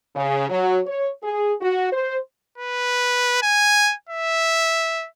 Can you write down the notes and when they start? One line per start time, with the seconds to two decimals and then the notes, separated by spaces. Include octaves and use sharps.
0.16 C#3
0.50 F#3
0.86 C#5
1.23 G#4
1.61 F#4
1.92 C5
2.58 B4
3.43 G#5
4.10 E5